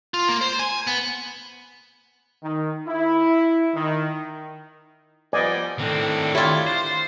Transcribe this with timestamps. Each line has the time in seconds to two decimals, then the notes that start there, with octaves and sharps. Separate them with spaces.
0.14 F4
0.29 A#3
0.41 C5
0.59 G#5
0.87 B3
2.43 D#3
2.87 E4
3.74 D#3
5.33 F3 G3 B3 D5 D#5 G#5
5.79 A2 D3 D#3 C4 D4
6.35 E4 F4 G4 C#5 E5
6.67 C5